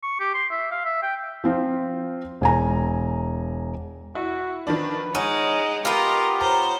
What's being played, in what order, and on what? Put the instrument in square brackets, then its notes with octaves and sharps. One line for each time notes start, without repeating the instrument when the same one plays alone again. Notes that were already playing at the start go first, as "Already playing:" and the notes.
[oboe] C#6
G4
C6
E5
F5
E5
G5
[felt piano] F3 C4 F4
E1 G#5 A#5
[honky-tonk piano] E4 [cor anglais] F#4
[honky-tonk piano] D#3 F3 D4 [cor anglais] B4
[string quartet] G#3 [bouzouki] C#4 [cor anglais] D#4 [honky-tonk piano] F#5
[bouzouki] B3 F4 [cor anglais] G4 [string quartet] A#4 D#5
[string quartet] C5 C#5 [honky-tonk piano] A#5